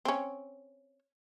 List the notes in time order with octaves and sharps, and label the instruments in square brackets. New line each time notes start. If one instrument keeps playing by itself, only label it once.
[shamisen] C4 C#4